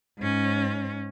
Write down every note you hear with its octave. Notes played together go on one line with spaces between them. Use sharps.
G#2 C#4